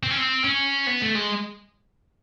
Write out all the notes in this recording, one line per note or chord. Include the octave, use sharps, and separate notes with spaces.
C4
C#4
C4
C#4
B3
A3
G#3